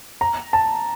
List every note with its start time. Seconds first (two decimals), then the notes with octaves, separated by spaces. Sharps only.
0.21 A#5
0.53 A5